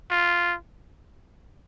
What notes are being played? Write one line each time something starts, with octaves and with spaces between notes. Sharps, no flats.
F4